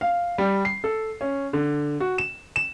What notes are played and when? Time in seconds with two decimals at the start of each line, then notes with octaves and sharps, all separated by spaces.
0.01 F5
0.38 G3
0.65 C7
0.84 A4
1.21 C#4
1.53 D3
2.00 F#4
2.18 E7
2.56 E7